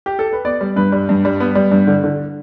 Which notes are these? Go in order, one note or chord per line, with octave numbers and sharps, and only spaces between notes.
G4
A4
B4
B3 D5
G3
G2 B4
G3
G2
G3
B3
G3
G2
D3
D3